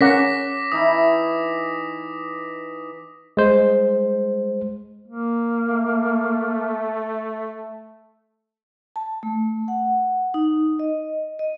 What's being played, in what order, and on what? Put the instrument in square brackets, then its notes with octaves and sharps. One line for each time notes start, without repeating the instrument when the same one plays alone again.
[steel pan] C#4 A#4 F#5 [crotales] D6 A#6 B6
[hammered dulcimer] E3 D#4 E4 [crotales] D#6
[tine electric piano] G#3 C5
[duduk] A#3
[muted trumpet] A3
[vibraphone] A5
A3
F#5
D#4
D#5
D#5